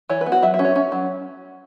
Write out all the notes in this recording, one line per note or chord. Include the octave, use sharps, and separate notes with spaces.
E3 C#5
B4
B3
F#4
F#3 E5
E5
C#4
C#5
C#4
F#3